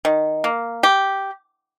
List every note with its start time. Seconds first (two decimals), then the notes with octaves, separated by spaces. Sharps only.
0.05 D#3
0.44 A#3
0.83 G4